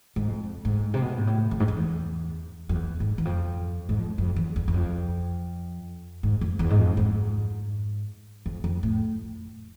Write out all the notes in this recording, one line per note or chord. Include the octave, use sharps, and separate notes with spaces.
G#2
F2
G#2
C3
B2
G#2
A2
F2
G#2
F2
E2
F2
E2
G#2
E2
F2
G#2
F2
F2
E2
E2
E2
F2
G#2
F2
E2
G#2
F2
G#2
F2
F2
A2